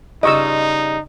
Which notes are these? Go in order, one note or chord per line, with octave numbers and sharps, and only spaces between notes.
G2 C#3 D#4 F4 D#5 C#6 E6